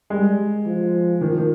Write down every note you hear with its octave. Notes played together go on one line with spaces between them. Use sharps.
G3 G#3
F3
D#3
F3
D#3